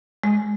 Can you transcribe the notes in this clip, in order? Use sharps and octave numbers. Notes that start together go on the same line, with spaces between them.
G#3